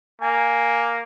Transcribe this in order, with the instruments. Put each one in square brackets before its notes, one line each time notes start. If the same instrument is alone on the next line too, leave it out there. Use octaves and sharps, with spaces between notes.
[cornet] A#3 [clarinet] G#5